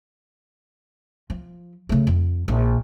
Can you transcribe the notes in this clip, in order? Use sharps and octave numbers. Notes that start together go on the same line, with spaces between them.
F3
C#3 A3
F2
A#1